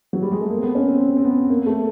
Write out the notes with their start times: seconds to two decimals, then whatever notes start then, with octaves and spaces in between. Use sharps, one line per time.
0.13 F#3
0.22 G3
0.32 G#3
0.41 A3
0.50 A#3
0.57 C4
0.63 B3
0.75 C#4
0.87 C4
1.00 C4
1.17 C4
1.25 B3
1.50 A#3
1.66 A3